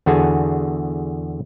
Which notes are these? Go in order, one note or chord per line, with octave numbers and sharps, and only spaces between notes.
E2 D3 F#4 G#4 G#5 A5